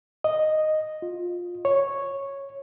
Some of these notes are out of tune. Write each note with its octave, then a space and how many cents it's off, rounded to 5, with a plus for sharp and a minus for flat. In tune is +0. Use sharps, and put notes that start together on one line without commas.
D#5 -5
F4 +15
C#5 -5